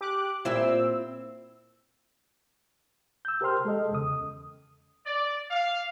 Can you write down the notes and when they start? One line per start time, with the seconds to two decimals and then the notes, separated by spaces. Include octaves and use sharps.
0.01 G4 D6 F#6
0.45 A#2 C4 E4 C5 E6
3.25 E6 G6
3.41 G4 A#4 C5 G5 C6 F6
3.65 G#3 A4 D#5
3.91 E2 C#3 D#6
5.06 D5
5.51 F5